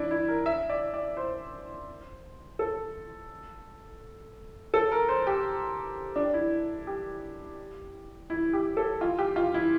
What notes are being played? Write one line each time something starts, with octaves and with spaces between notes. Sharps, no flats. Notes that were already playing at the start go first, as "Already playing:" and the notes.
Already playing: D4 E4
E4
A#4
E5
D5
D5
C5
A4
A4
A#4
C5
G4
D4
E4
G4
E4
G4
A4
F4
G4
F4
E4